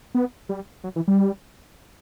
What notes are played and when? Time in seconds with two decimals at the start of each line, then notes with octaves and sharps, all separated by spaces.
0.15 B3
0.49 G3
0.84 F#3
0.96 E3
1.08 G3